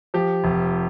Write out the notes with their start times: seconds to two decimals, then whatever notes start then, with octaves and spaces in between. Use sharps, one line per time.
0.14 F3 G4
0.44 F1